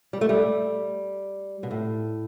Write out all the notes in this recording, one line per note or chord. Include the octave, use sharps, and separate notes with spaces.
G3
A3
G3
B2
A2